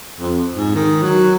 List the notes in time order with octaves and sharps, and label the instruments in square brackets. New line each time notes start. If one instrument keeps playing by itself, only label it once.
[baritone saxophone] F2
G#2
D#3
F#3